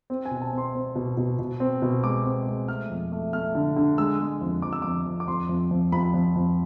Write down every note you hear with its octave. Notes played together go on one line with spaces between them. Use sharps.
C4
G#5
B2
G#5
A5
C4
C6
C4
B2
B2
B2
C4
B2
G#3 D6
C4
G#3
A3 F6
F2
A3
A3 F6
D3
D3
G#3 E6
G#3
F2
F2 D6
E6
F2 D6
F2
D6
F2 C6
F2
F2
F2 B5
F2
F2